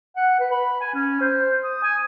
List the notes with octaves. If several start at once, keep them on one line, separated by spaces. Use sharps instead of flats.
F#5
B4
B5
G#5
C#4
C5
D#6
G#5